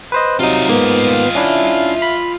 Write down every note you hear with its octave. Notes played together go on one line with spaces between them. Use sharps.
B4 C5 D#5
C3 F#3 D#4 F4 D#5
G#2 A#3 B3
C#4 D4 E4 E5
B5